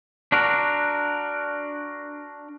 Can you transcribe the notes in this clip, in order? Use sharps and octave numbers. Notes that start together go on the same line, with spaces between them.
D4 F#4 A#4